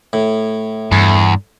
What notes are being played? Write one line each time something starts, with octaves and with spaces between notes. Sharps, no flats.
A2
E2 G2